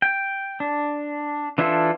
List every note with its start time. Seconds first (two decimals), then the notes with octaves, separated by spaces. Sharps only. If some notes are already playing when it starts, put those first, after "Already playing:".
0.02 G5
0.60 D4
1.58 E3 D4 E4 F4 A4